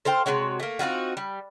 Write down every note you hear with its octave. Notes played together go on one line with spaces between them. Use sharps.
A4 C5 F5 G5
C3 G#3 F#4 C#5
A3 A#3
C4 D#4 F4 F#4
G3